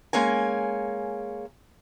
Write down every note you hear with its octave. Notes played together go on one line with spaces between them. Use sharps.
G#3 A#3 C#4 G#5